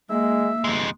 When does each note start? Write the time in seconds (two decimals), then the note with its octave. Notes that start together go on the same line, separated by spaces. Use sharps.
0.10 G#3 A#3 E5
0.64 G1 F2 G#3